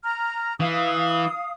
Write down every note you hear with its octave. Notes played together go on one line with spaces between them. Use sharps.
A#5 F6
E3 F5 D#6